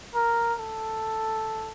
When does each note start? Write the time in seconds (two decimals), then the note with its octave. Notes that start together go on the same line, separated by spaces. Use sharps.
0.15 A#4
0.60 A4